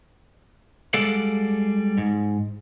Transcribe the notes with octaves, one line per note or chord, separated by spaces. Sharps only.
G3 G#3 A4 D5 F5 F#5
G#2